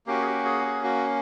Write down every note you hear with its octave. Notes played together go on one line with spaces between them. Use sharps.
A#3 C#4 F#4 G4
G#4
G4
G#4
G#4
F#4